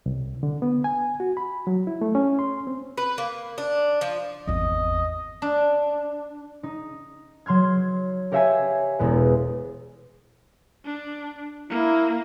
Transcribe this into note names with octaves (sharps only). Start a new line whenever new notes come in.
C2
D3
B3
G#5
F#4
B5
F#3
E4
A3
C#4
C6
C4
B4
A#3
D4
F3
G#1 E2 D#5
D4
D#4
F#3 C6 F6 G#6
G4 A#4 C#5 E5 F5 G#5
E1 E2 G#3 B4
D4
A#3 E4